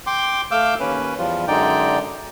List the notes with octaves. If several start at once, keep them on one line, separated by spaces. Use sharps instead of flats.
G5 C6 D6
A3 F5 D6 E6 G6
D#2 C#4 B4
E2 F3 G3 F4
F#2 D3 G#3 D#4 D5 G5